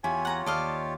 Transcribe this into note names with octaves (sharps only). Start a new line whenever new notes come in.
E2 E4 F4 G4 C#5 G#5
F#5 A#5
D#2 D5 D#5 F5 A5